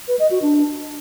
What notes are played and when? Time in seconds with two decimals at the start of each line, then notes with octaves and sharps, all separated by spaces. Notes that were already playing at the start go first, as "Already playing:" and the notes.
0.08 B4
0.19 D#5
0.31 F#4
0.42 D4